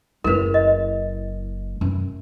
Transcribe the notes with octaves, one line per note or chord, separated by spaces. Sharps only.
F#1 E4 A#4 B4
D#5
F#2